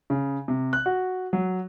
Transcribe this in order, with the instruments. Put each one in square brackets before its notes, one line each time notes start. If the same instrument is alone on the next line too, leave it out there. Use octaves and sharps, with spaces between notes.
[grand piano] C#3
C3
F#6
F#4
F#3